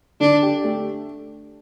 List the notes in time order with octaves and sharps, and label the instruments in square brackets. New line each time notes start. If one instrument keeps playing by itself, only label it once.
[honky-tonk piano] D3 [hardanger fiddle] D4
[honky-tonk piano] G4
A3